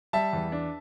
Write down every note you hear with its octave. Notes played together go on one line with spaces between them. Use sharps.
G3 E5 A5
E2
D4